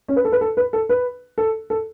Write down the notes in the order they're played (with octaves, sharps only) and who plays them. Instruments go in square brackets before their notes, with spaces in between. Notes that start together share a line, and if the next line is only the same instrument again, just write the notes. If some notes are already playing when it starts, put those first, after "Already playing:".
[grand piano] C#4
B4
A4
B4
A4
B4
A4
B4
A4
A4